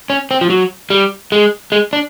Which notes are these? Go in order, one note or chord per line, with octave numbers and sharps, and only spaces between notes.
C#4
C4
F3
F#3
G3
G#3
G#3
D4